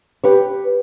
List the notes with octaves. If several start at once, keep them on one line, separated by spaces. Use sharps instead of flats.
G4 B4 C#5